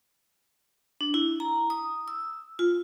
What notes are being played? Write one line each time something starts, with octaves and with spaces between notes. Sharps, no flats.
D4
E4
A#5
D#6
E6
F4